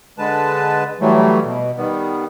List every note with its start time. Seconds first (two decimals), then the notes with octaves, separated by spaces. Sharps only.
0.18 D3 G#3 B4 A5
1.01 A2 E3 F#3 G3 A3
1.45 B2
1.77 D#3 G3 B3